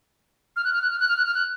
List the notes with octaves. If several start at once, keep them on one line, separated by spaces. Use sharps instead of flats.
F6
F#6
F6
F#6
F6
F#6
F6
F#6
F6
F#6